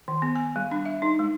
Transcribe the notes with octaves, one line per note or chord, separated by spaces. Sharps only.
D#3
B3
G#5
G3
D4
E5
D#4
G#3